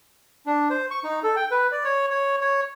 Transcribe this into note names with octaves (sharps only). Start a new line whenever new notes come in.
D4
C5
C#6
D#4
A4
G5
B4
D5
C#5
C#5
C#5